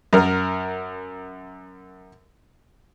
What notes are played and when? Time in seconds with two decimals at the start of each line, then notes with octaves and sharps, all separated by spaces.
0.13 F#2 A#4